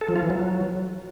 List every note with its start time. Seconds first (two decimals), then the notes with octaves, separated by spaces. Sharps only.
0.01 A4
0.09 F3
0.16 F4
0.23 E3
0.30 F#3